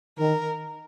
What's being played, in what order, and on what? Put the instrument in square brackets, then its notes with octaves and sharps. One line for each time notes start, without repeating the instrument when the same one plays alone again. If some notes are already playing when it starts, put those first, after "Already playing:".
[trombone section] D#3 [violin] A#4